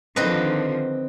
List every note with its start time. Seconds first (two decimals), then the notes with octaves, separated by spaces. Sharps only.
0.16 D3 D#3 F3 C4 B4 D#5